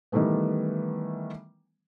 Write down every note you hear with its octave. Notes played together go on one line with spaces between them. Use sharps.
D#3 E3 G3 A3 B3